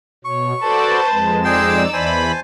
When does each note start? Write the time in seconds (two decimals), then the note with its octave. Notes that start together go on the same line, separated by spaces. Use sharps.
0.25 B2 C#5 C#6
0.62 F#4 A4 B4 C5 D5 A5
1.11 F2 G#3
1.44 D#4 G#4 D5 G5 C6 E6
1.93 E2 E3 E4 C5 G#5 A5 B5